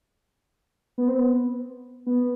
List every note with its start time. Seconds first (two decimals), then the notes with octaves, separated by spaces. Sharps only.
0.98 B3
1.08 C4
1.19 B3
2.06 B3